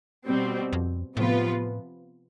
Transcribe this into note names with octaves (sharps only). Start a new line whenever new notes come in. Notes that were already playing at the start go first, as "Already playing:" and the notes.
B2 G3 C4
F2
A2 C3 F3 B3 F4 B4